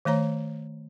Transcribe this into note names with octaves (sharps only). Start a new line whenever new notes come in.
D#3 A3 C#5 A#5